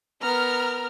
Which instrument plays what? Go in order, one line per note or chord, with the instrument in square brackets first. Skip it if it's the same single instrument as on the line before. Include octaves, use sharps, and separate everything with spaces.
[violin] B3 A#4 [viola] A#5 [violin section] F6